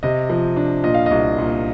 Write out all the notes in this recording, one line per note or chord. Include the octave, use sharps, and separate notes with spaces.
C3 D#5
F3
D4
A#2 D#5
F5
C2 D#5
A#2